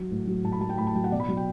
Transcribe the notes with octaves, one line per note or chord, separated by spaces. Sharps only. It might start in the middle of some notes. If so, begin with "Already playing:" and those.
Already playing: F#3
A2
F#3
A2 A5
B5
F#3 A5
G5
A2 B5
A5
F#3 G5
F#5
B2 D5
B5
F#3
G5